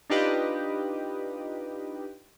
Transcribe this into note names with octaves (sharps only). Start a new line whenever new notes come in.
D4 D#4 F4 G4 B4 D#5